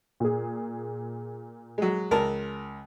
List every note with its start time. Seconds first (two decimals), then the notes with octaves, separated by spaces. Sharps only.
0.20 A#2 G#4
1.78 F#3 G#3
2.11 C#2 A#4 A5